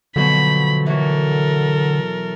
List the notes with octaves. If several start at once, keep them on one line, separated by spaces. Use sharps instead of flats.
B2 D3 F3 F#3 B5
E3 F#3 F#4 A4 A#4